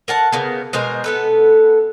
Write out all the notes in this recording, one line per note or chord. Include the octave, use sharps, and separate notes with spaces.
A#4 F#5 A5
C#3 A#3 B3
B2 G#3 A#4 C5
B3 A4 B4